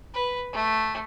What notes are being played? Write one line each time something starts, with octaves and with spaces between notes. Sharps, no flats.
B4
A3